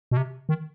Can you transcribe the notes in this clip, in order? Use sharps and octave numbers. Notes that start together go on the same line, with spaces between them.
B2
C3
D#3